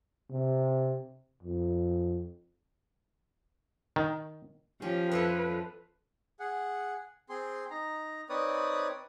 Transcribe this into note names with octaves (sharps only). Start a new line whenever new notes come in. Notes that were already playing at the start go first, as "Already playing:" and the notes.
C3
F2
D#3
F3 C#4 G4
F2 E4 A4 B4
G#4 F#5
C4 G#4 C6
D#4 A#5
C4 D#4 B4 C#5 D5 D#6